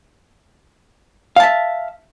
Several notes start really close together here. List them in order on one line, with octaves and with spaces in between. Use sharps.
F5 A5 E5